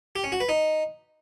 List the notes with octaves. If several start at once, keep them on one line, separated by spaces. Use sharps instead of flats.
G4
C#4
F#4
B4
D#4